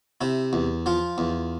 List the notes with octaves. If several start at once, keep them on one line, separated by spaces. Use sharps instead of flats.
C3 E4
E2
F3 F4
E2